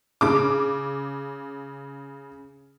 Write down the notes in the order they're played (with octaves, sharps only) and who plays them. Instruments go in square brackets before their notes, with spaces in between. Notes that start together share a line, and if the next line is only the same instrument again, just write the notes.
[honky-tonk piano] C#3 D6